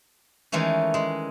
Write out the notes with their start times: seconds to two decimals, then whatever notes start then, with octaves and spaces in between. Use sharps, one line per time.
0.52 D#3 E3 G#3 A3 C#4
0.94 G#3